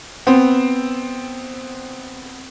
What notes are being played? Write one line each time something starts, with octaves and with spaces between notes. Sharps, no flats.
B3 C4